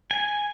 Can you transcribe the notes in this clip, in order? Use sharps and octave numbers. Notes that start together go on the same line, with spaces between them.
G#5